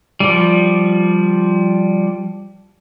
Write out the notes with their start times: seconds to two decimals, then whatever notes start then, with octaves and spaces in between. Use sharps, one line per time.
0.20 F3 G3